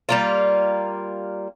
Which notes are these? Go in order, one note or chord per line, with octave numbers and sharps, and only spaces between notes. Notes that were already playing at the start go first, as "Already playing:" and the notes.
G3 A#3 F4